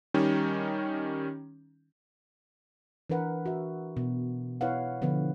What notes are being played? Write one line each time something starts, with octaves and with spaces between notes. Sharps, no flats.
D#3 G3 C#4 D#4
E3 D4 A#4 B4 F#5
F#4 E5
B2
E4 B4 C#5 F5 F#5
D3 F3 B3 B4